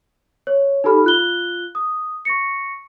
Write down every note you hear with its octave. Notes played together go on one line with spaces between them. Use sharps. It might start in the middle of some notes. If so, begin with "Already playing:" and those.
C#5
D#4 G4 A4 B5 F6
F4 F#6 G7
D#6
C#6 A#6 C#7